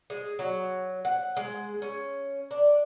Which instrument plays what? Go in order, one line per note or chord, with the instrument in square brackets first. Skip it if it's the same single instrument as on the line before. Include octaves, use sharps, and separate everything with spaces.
[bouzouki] G#3
F#3
F#5
G#3
C#4
D4